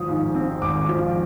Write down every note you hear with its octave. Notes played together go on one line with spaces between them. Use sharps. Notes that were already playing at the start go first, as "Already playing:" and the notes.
Already playing: G#1 F3 D#6
G#2
C4
G#1 D6
F3